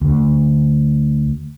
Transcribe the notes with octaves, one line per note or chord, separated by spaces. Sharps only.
D2